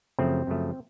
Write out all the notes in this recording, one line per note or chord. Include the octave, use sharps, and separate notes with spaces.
F#2 C#3 F3 A3 C4
F#2 C#3 F3 A3